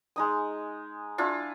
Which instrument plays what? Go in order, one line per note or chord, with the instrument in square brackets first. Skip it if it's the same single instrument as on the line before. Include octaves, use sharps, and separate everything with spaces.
[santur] G#3 D#4 D#6
D4 E4 F4